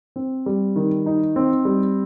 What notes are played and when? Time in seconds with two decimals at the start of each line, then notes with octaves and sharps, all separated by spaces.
0.16 C4
0.46 G3
0.76 D#3
1.06 D#4
1.36 C4
1.65 G3